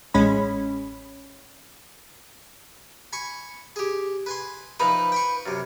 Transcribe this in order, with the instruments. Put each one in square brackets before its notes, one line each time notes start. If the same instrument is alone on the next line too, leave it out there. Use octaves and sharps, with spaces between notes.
[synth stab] A1 G#3 C#4 B5
[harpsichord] G#5 B5 C#6
G4 G#4
B4 G#5 C6
[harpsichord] F3 D#4 E4 [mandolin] B4
[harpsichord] G5 B5 C#6
F#2 C3